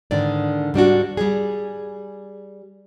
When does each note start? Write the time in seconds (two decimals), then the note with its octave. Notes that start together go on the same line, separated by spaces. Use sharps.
0.11 G#2 D3 D#3 D5
0.74 G#2 G3 D4 F#4
1.17 G3 G#4